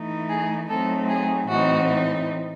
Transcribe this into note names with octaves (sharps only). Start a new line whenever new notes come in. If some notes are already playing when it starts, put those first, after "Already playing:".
Already playing: E3 A3 D#4
G#4
F#3 A3 C4 D#4 A4
G#4
A2 E3 A3 C4 D#4 F#4